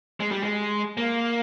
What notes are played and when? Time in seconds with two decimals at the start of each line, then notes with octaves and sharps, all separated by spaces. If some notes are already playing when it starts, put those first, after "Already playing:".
0.20 G#3
0.31 G3
0.43 G#3
0.97 A#3